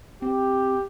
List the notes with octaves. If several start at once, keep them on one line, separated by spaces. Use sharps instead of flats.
C4 G4